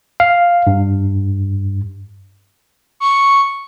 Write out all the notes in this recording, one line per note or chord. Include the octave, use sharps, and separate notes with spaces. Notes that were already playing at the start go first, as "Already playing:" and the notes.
F5
G2
C#6